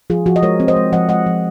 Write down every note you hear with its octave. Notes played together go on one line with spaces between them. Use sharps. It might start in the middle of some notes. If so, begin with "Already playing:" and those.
F3 F4 G#4
F3 F#4
D#5
G#3 A#4 C#5
C4
C5 D#5
G#3
F3 D#5 F#5
G#3 D#5 F#5
F3